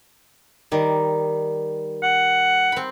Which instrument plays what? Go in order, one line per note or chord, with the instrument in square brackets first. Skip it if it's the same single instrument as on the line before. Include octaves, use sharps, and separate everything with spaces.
[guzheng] D#3 G3
[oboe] F#5
[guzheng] C4 B5